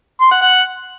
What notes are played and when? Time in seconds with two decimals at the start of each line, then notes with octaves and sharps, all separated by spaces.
0.21 C6
0.31 F#5
0.41 F#5